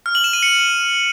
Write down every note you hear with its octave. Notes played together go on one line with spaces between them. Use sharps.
F6
F#7
E7
D#7
C#7